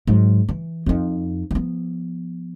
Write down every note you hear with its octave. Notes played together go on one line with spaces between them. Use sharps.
G#2 F#3
E3
F2 D#4
F3 B3